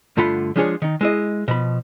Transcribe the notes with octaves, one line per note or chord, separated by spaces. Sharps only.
G2 D3 A3 F4 F#5 B5
F3 G#3 D4 F4 G#4 C#5
D#3 D#4
G#3 E4 D#5
B2 F3 B5